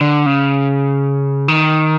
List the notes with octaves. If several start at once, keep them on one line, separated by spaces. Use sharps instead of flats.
D3
C#3
D#3